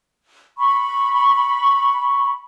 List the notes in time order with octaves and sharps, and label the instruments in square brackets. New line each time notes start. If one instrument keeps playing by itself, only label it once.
[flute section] B5 C#6